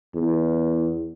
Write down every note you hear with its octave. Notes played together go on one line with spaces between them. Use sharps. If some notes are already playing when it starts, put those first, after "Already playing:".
E2